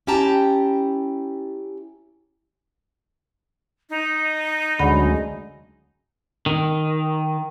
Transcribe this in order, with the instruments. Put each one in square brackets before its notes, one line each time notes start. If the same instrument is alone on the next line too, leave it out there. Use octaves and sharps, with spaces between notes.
[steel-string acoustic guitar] C#4 E4 G4 G5 A5 A#5
[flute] D#4
[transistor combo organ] D2 [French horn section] C#3 F#3 G#3 [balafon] D5 F#5 B5
[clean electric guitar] D#3